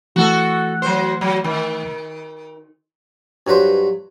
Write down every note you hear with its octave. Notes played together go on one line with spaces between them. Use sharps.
E3 A3 F#4 A4 F#5
F#3 C5
F#3
D#3
G2 F#3 B4 C5